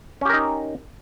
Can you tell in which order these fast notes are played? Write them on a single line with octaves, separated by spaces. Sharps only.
C#4 G4 A#4 D#4